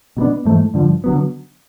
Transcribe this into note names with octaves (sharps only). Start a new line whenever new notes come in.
B2 F#3 B3 D4
G#2 E3 A3
G2 D3 F3
D3 F#3 B3